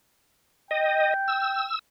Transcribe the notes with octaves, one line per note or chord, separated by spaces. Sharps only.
D#5 G5
E6